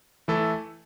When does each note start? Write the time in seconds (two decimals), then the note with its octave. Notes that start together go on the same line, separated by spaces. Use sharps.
0.28 E3 A3 E4 A4